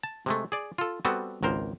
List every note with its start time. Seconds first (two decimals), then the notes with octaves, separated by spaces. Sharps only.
0.03 A5
0.26 C3 G#3 A3
0.52 G#4 D5
0.78 F4 A4
1.05 G3 B3 C4 F#4 A4
1.43 G#1 C#2 A#4 C5